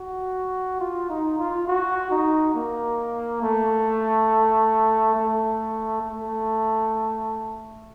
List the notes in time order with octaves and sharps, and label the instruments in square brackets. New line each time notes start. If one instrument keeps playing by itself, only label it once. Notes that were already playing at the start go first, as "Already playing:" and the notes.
Already playing: [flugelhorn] F#4
F4
D#4
F4
F#4
D#4
A#3
A3
A3
A3